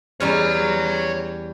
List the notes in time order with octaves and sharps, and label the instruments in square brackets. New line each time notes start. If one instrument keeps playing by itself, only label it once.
[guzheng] E2 G3 C#4 [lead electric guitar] C#5 A#5